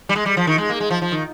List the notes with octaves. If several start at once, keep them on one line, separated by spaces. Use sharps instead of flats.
G3
G#3
G3
F3
D#3
G#3
A#3
G#3
F3
F3
D#3